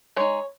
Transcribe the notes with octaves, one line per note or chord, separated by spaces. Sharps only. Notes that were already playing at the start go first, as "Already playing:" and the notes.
G#3 D#4 C#5